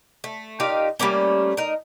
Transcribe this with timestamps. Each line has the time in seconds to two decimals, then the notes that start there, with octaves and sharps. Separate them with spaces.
0.24 A3
0.60 A#2 D#4 G4 F5
0.99 G3 A3 A#3 C#4
1.57 D#4 A#4